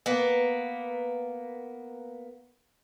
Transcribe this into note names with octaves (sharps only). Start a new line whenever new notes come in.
A#3 B3